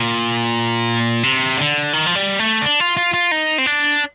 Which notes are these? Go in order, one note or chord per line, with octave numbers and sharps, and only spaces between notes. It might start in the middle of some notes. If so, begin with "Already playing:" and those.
Already playing: A#2
C3
D3
D#3
F3
G3
A3
D4
F4
F4
F4
D#4
C4
D4